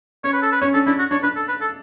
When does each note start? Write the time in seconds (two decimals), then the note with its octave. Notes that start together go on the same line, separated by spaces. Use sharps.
0.24 C#4 C#5
0.33 B4
0.42 A4
0.52 B4
0.62 C#4 C#5
0.74 D4 A4
0.87 D4 E4
0.99 F#4
1.11 D4 C#5
1.23 D4 B4
1.36 A4
1.48 B4
1.61 A4